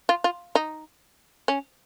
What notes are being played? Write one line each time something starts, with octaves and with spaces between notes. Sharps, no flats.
F4
F4
D#4
C#4